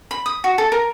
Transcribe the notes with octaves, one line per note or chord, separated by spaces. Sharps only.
B5
D#6
F#4
A4
A#4